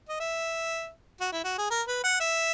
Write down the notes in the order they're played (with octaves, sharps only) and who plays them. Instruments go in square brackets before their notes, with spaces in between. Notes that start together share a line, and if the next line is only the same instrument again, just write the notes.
[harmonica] D#5
E5
F#4
E4
F#4
G#4
A#4
B4
F#5
E5